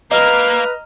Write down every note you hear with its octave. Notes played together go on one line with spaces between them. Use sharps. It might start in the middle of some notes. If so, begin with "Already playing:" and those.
A#3 B4 D#5 A#5 F6